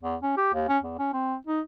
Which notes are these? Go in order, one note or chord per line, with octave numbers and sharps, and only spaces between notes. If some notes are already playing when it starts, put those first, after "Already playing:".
E2
C#4
G4
D#2
C#4
E2
C#4
C4
D#4